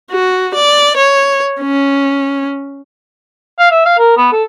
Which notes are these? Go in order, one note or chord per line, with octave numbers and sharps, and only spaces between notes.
F#4
D5
C#5
C#4
F5
E5
F5
A#4
B3
A4